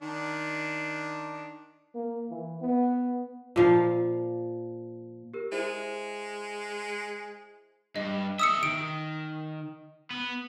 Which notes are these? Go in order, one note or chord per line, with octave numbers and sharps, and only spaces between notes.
D#3 D4
A#3
E3
B3
A#2 F3 F5
G4 A#4
G#3 E4 C5 E5
G2 D#5
G#4 E5 D#6 E6 C#7
D#3 D7
B3